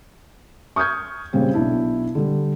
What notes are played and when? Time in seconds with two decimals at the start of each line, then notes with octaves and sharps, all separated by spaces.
0.76 C#6 D#6 F6 G6 G#6
1.33 A#2 C#3 G3 C4
1.54 B1 D4 E4
2.15 D3 G3